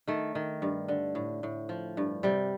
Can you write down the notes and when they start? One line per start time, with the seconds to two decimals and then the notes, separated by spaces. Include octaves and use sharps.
0.07 D#3 A3
0.35 D#3
0.62 G2
0.88 D3
1.15 A2
1.43 A2
1.69 F3
1.97 G2
2.23 C3 G3